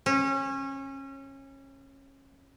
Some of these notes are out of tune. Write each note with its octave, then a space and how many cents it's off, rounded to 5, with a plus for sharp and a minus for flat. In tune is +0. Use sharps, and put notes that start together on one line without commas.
C#4 -25